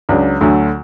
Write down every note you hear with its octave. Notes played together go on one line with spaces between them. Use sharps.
C#2 C#3 F#3 D4
D2 D3 F#3 A3